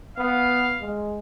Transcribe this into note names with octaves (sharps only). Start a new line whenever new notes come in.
B3 F5
G#3